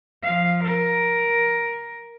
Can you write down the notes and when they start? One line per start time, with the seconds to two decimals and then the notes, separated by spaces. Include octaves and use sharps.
0.23 F3 F5
0.64 A#4